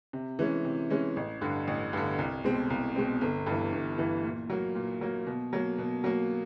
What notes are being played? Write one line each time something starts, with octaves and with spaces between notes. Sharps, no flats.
C3
E3 G#3 C#4
C3
E3 G#3 C#4
A1
G2 D3
A1
G2 D3
C2
B2 G#3 C4
C2
B2 G#3 C4
G1
G2 E3
G1
G2 E3
A#2
F#3 A#3
A#2
F#3 A#3
B2
F#3 A#3
B2
F#3 A#3